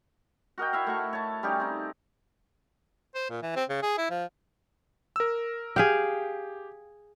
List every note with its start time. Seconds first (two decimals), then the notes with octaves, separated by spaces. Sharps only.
0.58 F#4 A#4 D#5 G5
0.73 E4 E5 F5
0.87 A3 F#4 C#6
1.13 C#5 A5
1.43 G3 C#4 D#4 G4
1.60 C4 D#4
3.15 C5
3.30 A#2
3.43 E3
3.56 C4
3.70 C#3
3.83 G#4
3.98 E4
4.10 F3
5.16 A#4 E6
5.76 G4 G#4 F5 G5